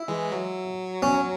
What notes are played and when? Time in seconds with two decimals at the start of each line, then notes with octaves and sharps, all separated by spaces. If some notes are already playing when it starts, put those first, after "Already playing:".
Already playing: E4
0.08 E3 G#3
0.32 F#3
1.02 C#4